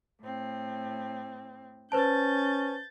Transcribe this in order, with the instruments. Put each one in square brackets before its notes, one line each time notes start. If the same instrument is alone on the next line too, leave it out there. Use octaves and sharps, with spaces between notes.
[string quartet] A2 C4
[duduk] C#4 [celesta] B4 C5 A5 [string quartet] G6 A6